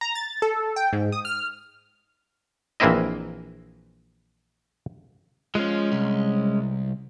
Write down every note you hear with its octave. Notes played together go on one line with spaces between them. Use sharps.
A#5
A6
A4
G5
G#2
D#6
F6
A#1 E3 A#3 C4 E4 D#5
F3 G#3 C#4
C2